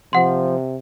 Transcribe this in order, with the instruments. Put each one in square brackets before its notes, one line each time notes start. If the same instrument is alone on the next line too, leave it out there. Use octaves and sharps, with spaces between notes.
[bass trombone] C3 [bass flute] F3 [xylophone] F#5 C6